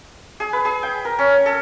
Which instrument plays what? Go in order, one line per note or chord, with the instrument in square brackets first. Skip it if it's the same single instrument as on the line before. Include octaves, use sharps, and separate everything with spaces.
[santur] G#4
B4
G#4
G5
A#4
C#4
A4